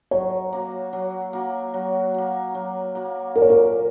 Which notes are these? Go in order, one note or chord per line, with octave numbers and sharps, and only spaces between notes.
F#3 C#5
A#3 F#4
F#3
A#3 F#4
F#3
A#3 F#4
F#3
A#3 F#4
A#2 A#4
C#5
A#4